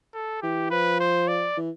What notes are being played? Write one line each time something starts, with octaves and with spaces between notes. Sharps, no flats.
A4
E3 G4
F3 B4
C5
D5
E3